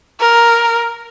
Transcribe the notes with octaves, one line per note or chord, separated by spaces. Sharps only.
A#4